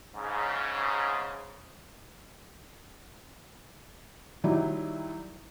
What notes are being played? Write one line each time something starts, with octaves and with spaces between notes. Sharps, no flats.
G#2 C#3
D#3 F#3 G3 D#4 E4